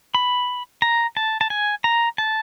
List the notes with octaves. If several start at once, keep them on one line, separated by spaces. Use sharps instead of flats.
B5
A#5
A5
A5
G#5
A#5
A5